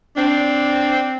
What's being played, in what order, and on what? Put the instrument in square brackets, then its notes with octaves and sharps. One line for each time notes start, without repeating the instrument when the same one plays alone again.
[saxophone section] C4 D4